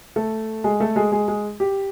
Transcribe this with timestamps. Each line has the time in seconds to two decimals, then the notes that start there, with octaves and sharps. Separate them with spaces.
0.16 A3 A4
0.64 G#3 G#4
0.80 A3 A4
0.96 G#3 G#4
1.12 G#3 G#4
1.28 G#3 G#4
1.60 G4